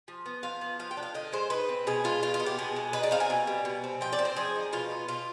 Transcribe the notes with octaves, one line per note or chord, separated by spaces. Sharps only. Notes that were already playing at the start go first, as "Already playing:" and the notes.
F3
B3
F3 F5
B3
F3 F5
G5
D4
F5
D3 D#5
G#3 C5
D#4 B4
C4
B2 G#4
G#3 F4
B2 F4
F4
B3
G4
B2 G#4
G#3
D#4 B4
D5
C4 F5
G#5
B2
G3
B2
C4
F3 G5
D5
C4
C5
F3 G#4
D#4
B2 F4
B3
B2 F4